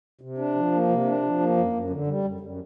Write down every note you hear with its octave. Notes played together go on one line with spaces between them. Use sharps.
C3
D4
F3
A#3
C3
D4
F3
A#3
F#2
F#2
D3
G3
F#2
F#2